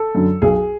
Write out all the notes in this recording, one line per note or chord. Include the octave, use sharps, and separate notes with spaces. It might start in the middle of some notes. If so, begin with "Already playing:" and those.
Already playing: A4
F#2 D3 F#3
B1 G#4